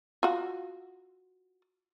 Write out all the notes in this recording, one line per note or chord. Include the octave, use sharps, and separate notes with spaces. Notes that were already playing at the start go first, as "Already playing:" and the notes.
F4 F#4